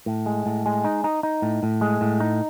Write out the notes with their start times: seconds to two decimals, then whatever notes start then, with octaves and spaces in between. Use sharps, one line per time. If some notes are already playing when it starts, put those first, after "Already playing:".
0.06 A2
0.26 G#3
0.46 A2
0.66 G#3
0.85 D#4
1.04 D#4
1.23 D#4
1.42 A2
1.63 A2
1.81 G#3
2.01 A2
2.20 D#4